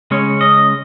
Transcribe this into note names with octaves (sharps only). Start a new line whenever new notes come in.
C#3 G#3 C#4 C#5
D#5